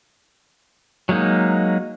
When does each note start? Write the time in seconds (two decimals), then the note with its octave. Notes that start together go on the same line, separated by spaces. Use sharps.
1.09 F#3 G#3 A#3 D#4